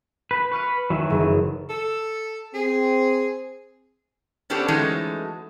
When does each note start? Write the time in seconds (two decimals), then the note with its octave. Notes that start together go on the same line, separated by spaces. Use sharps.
0.31 B4
0.52 B4 C#6 F6 D#7
0.90 D#3 E3 F#3
1.10 F#1
1.69 A4
2.54 C4 G#4
4.50 B3 C#4 D4 G4 A4 C5
4.68 E3 F#3 G#3 A3 C#4 D#4